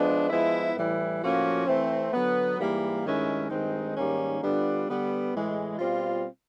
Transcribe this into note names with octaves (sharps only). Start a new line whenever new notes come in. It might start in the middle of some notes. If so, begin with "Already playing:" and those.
Already playing: F3 G#3 B3 D4
F3 G#3 B3 E4
A2 E3 G3
A2 F3 A#3 C#4 F#4
E3 A3 C4
D3 F#3 B3
G#2 E3 G3 A#3
G2 D#3 G#3 C#4 E4
G2 D#3 G#3 C4 D#4
G#2 D#3 G3 A#3 C#4
D3 G3 B3 D4 F4
D3 G3 B3
A2 E3 G#3
B2 G3 C4 F4